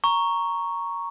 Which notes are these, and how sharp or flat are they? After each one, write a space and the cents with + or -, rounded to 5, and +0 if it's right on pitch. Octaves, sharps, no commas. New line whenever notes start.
A#5 +0 C#6 +0